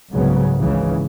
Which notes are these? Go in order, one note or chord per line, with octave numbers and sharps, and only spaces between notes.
C2 G#2 C#3 F#3 B3
G#1 C#2 G#2 C#3 E3